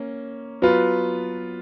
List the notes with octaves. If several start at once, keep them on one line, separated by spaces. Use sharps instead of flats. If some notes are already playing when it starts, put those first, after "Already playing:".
Already playing: A#3 C#4
F#3 B3 F4 B4